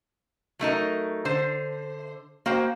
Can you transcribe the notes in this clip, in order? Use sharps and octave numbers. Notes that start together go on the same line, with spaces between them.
F#3 A3 D#4 A#4
D3 C5
A#3 F#4 C5 G5